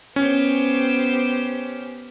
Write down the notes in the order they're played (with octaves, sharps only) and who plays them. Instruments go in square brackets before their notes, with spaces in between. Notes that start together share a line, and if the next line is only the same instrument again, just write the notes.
[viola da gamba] B3 G4 C5 [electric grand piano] C#4